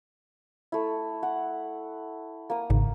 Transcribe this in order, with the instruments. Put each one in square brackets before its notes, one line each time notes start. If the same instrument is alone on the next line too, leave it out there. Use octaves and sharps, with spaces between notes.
[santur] A3 E4
F#5
A#3 D#6
[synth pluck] G#1 G#2 C#3